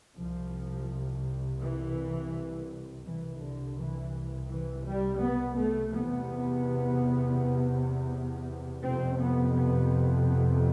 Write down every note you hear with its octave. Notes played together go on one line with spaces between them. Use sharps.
C2 C3 F3
E3
C2 C3 E3
D3
E3
E3
G3
B3
A3
E2 C3 B3
F2 C3 C4
B3
B3
B3